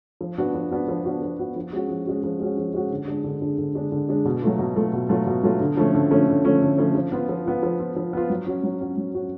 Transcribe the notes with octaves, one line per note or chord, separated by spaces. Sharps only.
F3
B3 D4 F#4
F3
B3 D4 F#4
F3
B3 D4 F#4
F3
B3 D4 F#4
F3
G#3 C#4 F#4
F3
G#3 C#4 F#4
F3
G#3 C#4 F#4
F3
G#3 C#4 F#4
D3
G#3 D4
D3
G#3 D4
D3
G#3 D4
D3
G#3 D4
B2
F#3 A3 F4
B2
F#3 A3 F4
B2
F#3 A3 F4
B2
F#3 A3 F4
D3
F3 A3 C#4
D3
F3 A3 C#4
D3
F3 A3 C#4
D3
F3 A3 C#4
F3
B3 F4
F3
B3 F4
F3
B3 F4
F3
B3 F4
F#3
C#4 F#4
F#3
C#4 F#4
F#3
C#4 F#4